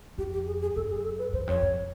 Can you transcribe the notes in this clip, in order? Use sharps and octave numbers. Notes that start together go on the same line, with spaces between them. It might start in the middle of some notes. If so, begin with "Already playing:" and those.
F2 G4
G4
G#4
G#4
F#2 A4
G#4
A4
B4
E2 C5
F2 C#5
F2